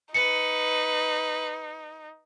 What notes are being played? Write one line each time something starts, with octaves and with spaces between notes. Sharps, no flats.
D#4 B4 C#7